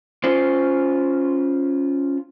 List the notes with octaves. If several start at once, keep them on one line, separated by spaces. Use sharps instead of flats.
C#4 F4 C5